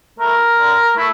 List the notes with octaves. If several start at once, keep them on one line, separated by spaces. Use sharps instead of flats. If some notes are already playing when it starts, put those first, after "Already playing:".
A3 E4 A#4
D3
A3 E4